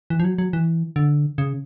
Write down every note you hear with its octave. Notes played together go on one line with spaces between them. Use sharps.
E3
F3
F#3
F#3
E3
D3
C#3